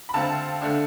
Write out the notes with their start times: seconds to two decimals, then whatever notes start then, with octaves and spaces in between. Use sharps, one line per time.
0.09 B5
0.14 D3 A3 C4 F5 A5
0.62 D3 A3 D4